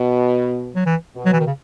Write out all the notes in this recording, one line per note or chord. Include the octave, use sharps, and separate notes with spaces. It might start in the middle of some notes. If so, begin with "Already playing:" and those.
Already playing: B2
F#3
E3
B2
F#3
E3
D#3
C#3